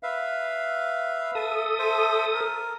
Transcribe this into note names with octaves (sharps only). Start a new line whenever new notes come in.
B4 E5 F5
A4 E5 D#6
C5 E5
A#4